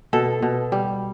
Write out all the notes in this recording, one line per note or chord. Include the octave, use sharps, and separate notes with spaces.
B2 A4
B2
G3